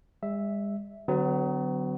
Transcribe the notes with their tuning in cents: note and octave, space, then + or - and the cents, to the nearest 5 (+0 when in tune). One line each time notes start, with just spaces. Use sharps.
G#3 -45 E5 +0
D3 +0 F#3 +15 B3 +45